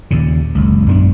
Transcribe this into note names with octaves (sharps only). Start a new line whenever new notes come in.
D#2 A#2 C#3
F#1 C#2
A#1 F#2 B3 D4